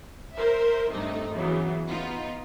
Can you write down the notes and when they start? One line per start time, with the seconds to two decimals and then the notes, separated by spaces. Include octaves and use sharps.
0.34 A#4 C5 E5
0.90 G2 C3 A3 D#4
1.33 C#3 E3 F#3 B3
1.89 B3 D#4 F4